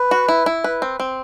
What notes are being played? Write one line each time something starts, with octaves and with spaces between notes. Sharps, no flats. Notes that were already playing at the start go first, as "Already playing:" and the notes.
Already playing: B4
F#4
E4
E4
B4
C4
C4